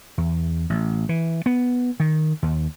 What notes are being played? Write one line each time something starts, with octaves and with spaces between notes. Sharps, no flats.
E2
A1
E3
B3
D#3
D#2